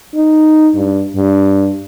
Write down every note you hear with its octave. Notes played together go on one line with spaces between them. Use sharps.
D#4
G2
G2